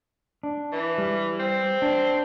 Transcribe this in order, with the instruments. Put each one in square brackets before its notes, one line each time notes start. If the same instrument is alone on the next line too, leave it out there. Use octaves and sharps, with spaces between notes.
[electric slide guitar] D4
[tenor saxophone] E3
[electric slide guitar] G3
[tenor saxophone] C4
[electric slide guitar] D4